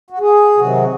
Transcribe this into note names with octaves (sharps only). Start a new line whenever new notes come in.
F#4
G#4
C3 D#3 F#3 F#4